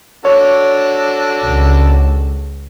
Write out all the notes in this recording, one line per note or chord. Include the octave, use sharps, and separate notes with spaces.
D4 F#4 A4 C#5
C#2